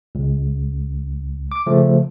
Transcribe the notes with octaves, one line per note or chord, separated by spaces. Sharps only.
C#2
D6
C#3 F3 A3